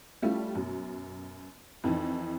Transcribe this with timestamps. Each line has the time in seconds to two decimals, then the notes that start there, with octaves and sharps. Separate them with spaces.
0.22 G3 A3 C#4 E4 F4
0.55 F#2 B2
1.84 F2 E3 D#4